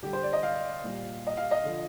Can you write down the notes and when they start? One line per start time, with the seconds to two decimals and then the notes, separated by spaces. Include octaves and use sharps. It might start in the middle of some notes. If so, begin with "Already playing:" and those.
0.03 D3 G3 G4
0.13 C5
0.23 D5
0.33 D#5
0.43 F5
0.84 A#2 G3
1.27 D#5
1.37 F5
1.51 D#5
1.64 D3 F3